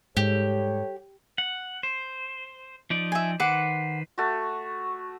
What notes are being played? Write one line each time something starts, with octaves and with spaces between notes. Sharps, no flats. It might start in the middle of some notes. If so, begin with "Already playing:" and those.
G#2 G3 G4 A4 C#5
F#5
C5
F3 D#4 D5
E5 G#5
D#3 B4 C5 F#5 D6
A3 F#4